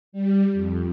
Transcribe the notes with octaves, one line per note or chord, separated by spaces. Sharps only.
G3
F2